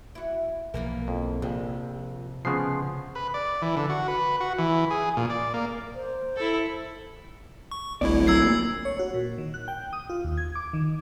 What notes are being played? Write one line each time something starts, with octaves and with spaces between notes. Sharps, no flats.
E4 F#4
B1 E3 F3 A#3 A#4
F2
A#1 F2 C3
C#3 F3 G#3 B3 C7
B4
D5
E3
D3
F#4
B4
F#4
E3
G#4
A#2
D5
A#3
C5
E4 A4
C#6
D1 G1 C2 E4 C#5 D5
F#2 A#4 E6 G#6 C7
D#2 A#2
C#5
F#4
A#2
D#3
F#6
G5
D#6
F4
D#2
G#6
D6
D#3